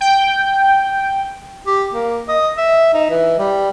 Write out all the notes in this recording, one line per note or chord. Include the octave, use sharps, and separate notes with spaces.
G5
G4
A#3
D#5
E5
D#4
E3
G3